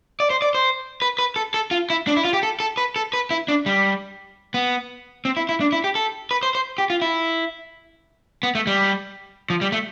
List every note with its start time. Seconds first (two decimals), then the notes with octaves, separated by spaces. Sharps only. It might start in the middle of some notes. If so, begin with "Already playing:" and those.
0.20 D5
0.30 C5
0.42 D5
0.55 C5
1.02 B4
1.19 B4
1.36 A4
1.54 A4
1.71 F4
1.90 E4
2.07 D4
2.17 E4
2.25 F4
2.33 G4
2.43 A4
2.60 A4
2.77 B4
2.96 A4
3.13 B4
3.31 E4
3.48 D4
3.66 G3
4.54 B3
5.25 C4
5.37 E4
5.49 E4
5.61 D4
5.72 E4
5.84 G4
5.95 A4
6.31 B4
6.43 C5
6.55 C5
6.78 G4
6.90 F4
7.02 E4
8.43 B3
8.55 A3
8.67 G3
9.50 F3
9.61 G3
9.72 A3